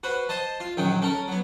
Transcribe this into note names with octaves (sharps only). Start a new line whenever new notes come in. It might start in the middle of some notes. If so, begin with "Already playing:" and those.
F#4 B4 C5
C5 D#5 A5
F4
A#1 F#2 D#3 F#3 G5
C#4 A4 A#4
F#3 B3